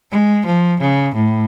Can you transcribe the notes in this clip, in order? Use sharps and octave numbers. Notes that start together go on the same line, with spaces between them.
G#3
F3
C#3
A2